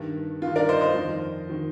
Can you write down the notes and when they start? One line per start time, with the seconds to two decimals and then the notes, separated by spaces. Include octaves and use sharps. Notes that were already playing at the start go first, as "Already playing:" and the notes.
Already playing: G2 D#3
0.42 G2 D#3 F4
0.56 A#4 D5
0.69 C5 D#5
0.81 C5 D#5
0.95 F2 D#3
1.50 D#3